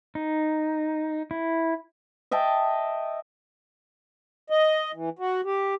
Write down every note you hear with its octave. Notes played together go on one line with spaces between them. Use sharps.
D#4
E4
D#5 E5 G5 A5
D#5
E3
F#4
G4